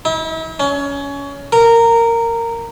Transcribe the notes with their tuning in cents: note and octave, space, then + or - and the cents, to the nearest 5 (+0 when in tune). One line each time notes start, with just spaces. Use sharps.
E4 -40
C#4 +25
A#4 -15